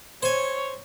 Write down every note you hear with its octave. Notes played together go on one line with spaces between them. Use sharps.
C5 C#5 G#5